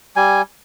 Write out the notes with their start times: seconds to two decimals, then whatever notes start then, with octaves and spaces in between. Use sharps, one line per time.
0.16 G3 G#5